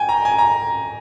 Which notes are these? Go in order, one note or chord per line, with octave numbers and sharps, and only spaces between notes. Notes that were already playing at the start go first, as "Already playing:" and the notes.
Already playing: G5 G#5
A#5
G#5
A#5